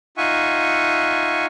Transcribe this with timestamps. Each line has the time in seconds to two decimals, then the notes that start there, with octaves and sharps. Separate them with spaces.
0.17 D#4 F4 E5 F#5 G#5 C#6